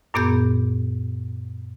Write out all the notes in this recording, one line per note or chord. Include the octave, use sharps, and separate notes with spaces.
F#2 A#2 B3 G#4 G6